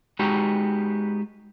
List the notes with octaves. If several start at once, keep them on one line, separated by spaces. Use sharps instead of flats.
G#3 B3 D#4 F#4 G4